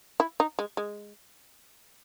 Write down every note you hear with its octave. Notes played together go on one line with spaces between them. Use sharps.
E4
D#4
G#3
G#3